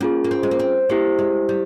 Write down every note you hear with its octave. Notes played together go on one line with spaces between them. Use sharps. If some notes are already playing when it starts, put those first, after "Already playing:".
A#3 C#4 F4 G#4
A#3
C4
G#3
A#3
C4
A#3 E4 G4 C5
G#3
G3